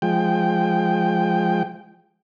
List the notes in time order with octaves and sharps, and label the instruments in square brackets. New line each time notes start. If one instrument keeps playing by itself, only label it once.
[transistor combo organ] F3 G#3 G5